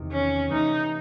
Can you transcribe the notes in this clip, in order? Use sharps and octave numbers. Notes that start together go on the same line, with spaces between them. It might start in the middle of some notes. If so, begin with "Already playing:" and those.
Already playing: E2 C3 D#3
C#4
C3 E3 A3 D#4